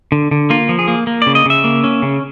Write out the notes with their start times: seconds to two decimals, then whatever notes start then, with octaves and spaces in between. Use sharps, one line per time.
0.12 D3
0.31 D3
0.50 A#3 F4
0.69 F3
0.79 G#4
0.88 A#3
1.07 A#3
1.22 C#3 D5
1.35 D#5
1.46 C#3 E5
1.64 A#3
1.84 C#4
2.02 C#3